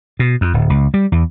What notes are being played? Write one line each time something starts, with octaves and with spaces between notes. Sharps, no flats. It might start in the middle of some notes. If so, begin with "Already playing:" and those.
B2
F2
D1
C#2
G3
E2